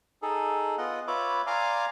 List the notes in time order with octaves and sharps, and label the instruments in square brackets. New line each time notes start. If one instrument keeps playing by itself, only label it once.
[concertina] D#4 G#4 A4
B3 F4 D#5 F#5
F4 B4 C#5 E5 B5 D6
D5 F5 G#5 A#5 C6 D6